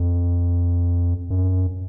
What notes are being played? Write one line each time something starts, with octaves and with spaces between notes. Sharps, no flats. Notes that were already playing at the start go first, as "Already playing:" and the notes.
Already playing: F2
F#2